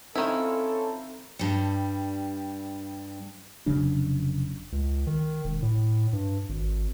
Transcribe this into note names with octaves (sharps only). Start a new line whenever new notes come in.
D#3 C4 C#4 E4 F4 A4
G2 G3
F1 C#3 F#3 D4
C#2
D#3
E1
A2
G2
G#1